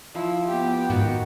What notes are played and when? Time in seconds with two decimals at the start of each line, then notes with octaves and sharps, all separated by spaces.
0.15 F3 E4
0.48 B3 G4
0.90 G#2 D#3 F#4